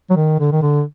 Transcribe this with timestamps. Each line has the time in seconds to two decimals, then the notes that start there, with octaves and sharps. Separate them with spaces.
0.10 F#3
0.16 D#3
0.40 D3
0.52 D#3
0.62 D3